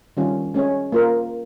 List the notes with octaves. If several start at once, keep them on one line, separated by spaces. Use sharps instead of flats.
D#3 G3 C#4 F4
G#3 C#4 G#4 C#5
A#3 F4 A#4